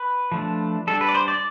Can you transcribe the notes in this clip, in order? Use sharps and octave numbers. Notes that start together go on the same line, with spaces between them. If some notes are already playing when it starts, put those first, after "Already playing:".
Already playing: B4
F3 A3 D4
G3 D4 A4
B4
D5
C5
D5